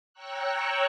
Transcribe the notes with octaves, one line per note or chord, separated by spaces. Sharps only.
C#5 G5 A#5 C#6 E6 F#6